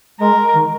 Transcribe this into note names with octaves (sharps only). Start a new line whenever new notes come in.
G#3 A#4
D#3